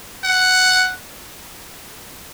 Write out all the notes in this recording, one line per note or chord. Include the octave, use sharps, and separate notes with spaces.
F#5